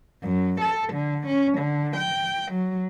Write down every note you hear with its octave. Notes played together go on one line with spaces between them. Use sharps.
F#2
A4
D3
C#4
D3
G5
F#3